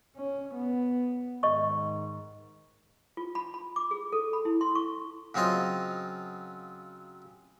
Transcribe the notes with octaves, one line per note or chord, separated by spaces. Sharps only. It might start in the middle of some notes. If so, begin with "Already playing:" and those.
C#4
B3
G#2 D#3 D#5 C#6
F4
B5
B5
D6
G#4
A4
B5
E4
C6
C#6
C#3 F#3 C4 F4 D#5